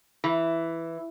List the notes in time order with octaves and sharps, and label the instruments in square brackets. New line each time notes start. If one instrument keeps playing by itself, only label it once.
[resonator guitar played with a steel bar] E3